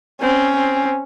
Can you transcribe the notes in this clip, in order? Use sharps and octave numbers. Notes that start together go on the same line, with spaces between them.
C4 C#4
C4